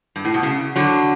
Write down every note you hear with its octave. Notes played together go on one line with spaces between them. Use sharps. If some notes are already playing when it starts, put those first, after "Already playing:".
G2
A2
B2
C#3
D3 F#3